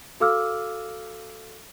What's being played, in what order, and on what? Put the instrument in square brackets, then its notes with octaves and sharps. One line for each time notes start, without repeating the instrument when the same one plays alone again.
[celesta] F#4 A4 F5 D6 E6 F6